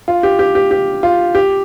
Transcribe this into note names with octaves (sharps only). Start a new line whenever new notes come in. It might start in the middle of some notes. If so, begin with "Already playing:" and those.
F4
G4
G4
G4
G4
F4
G4